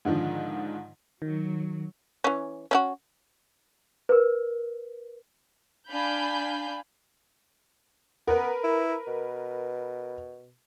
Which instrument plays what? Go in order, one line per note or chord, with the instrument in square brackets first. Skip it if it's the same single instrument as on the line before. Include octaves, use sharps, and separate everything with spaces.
[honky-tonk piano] G#2 D3 D#3 F3
[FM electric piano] D#3 [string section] F#3
[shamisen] E3 C#4
C#4 E4 F#4
[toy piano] A#4 B4
[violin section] D4 F5 G#5 B5 G6
[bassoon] B3 [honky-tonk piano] A#4 B4
[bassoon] E4
B2